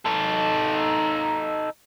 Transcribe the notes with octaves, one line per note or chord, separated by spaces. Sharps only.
D#4 A4